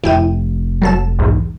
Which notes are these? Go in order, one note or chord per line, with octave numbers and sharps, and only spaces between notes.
F1 E4 G5 D#7
F#3 A4 E7
B1 E2 G#2